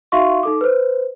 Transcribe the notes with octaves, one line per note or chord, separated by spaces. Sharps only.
D#4 F#4 E5 F5 C6 C#6
D#4 A4 D6
B4 C5